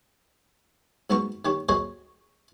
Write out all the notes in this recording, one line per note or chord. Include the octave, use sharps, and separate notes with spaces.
G#2 B2 B3 A#5 C#6
D#3 G4 C#5
F#4 G#4 C5 C#5 D#5